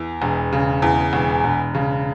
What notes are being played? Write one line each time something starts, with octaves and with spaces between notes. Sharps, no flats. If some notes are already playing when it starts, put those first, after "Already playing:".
Already playing: E2
E1
C#3
E2
E1
E1
C#3